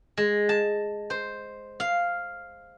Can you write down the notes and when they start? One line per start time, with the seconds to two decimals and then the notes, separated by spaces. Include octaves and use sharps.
0.17 G#3
0.49 A5
1.10 C5
1.80 F5